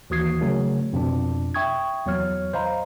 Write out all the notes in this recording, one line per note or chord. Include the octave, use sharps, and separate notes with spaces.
D#2 E3 F#4 D#6 G#6 C7
C#3 F#3 A3 A#4
F2 B2 D4
E5 G5 C#6 D#6 G#6
E2 F#3 C#5 F6
C5 D#5 F5 A#5 B5